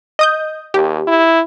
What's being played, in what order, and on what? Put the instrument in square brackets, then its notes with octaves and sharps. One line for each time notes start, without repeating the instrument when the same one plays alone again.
[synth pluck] D#5 D#6 G6
[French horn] D#2 [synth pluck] G4
[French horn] E4